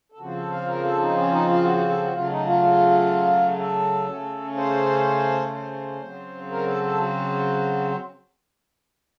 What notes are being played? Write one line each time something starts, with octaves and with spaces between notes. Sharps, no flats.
A4
C#3 F3 C4 F#4
A4
F5
A#4
A4
D#4
C#4
D#4
F4
F#4
F#4
A4
F#4
C#3 F#3 A3 F4
D#4
F4
A4
C#3 A3 C#4
C5
C5
C#3 F#3 C4
A#4
A4
A4
F#4